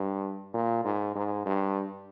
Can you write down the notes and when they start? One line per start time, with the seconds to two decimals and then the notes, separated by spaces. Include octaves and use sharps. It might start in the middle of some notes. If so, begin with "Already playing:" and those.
Already playing: G2
0.54 A#2
0.85 G#2
1.16 G#2
1.46 G2